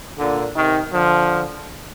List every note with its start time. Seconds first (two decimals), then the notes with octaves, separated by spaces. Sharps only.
0.18 A#2 D3
0.54 C3 D#3
0.91 D3 F3